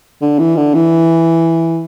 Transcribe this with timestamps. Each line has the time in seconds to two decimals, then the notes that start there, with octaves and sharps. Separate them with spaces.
0.21 D3
0.39 E3
0.57 D3
0.74 E3